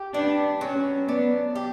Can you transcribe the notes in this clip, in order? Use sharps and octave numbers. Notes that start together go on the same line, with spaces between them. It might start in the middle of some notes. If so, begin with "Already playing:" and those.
Already playing: G4
B3 D4
F#3 C#4
B3 D4
G4